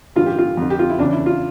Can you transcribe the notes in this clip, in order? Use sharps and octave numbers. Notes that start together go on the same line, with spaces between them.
A1 G2 D3 F4
G4
F4
F2 D3
G4
F4
E4
E2 C#3 E3 D4
E4
F4